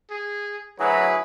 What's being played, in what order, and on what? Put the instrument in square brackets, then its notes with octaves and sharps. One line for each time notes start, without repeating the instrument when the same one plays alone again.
[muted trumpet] G#4
[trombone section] D2 F#3 [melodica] E4 G#4 [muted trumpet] B4